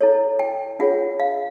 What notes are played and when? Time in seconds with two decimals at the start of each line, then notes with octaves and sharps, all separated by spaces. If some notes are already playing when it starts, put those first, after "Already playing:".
0.01 E4 A4 C#5
0.39 G5
0.79 D4 F4 G#4 C#5 F#5
1.20 F5